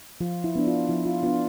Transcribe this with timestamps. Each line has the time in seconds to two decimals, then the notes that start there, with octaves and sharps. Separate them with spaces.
0.21 F3 F4
0.44 E4
0.56 B3 D4
0.67 F4
0.89 F3 E4
1.06 F4
1.23 B3 D4 F4